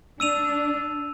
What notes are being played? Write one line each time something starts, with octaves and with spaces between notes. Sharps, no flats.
D4 E6 D#7 F7